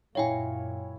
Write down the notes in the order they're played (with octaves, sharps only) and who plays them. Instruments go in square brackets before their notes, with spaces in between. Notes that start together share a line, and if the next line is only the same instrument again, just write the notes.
[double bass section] F#2 A#2 [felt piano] E4 C#5 [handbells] F5 G5 G#5